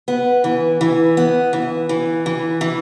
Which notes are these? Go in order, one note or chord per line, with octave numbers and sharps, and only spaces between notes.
B3
E3
E3
B3
E3
E3
E3
E3